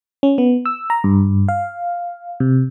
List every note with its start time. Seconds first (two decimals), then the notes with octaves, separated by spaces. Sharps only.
0.23 C#4
0.38 B3
0.66 E6
0.90 A#5
1.04 G2
1.49 F5
2.40 C3